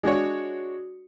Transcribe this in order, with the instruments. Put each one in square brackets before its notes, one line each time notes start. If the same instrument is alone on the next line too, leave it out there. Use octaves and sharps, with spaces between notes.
[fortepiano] G#3 D4 F#4 C#5